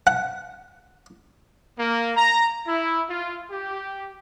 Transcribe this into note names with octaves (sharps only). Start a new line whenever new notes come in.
F#5
A#3
A#5
E4
F4
G4